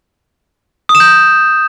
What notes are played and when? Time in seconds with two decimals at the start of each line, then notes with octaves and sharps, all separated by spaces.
0.89 D#6
0.95 E7
1.00 G6